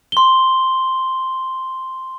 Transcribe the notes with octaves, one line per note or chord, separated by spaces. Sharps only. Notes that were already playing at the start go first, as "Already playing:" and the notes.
C6 G7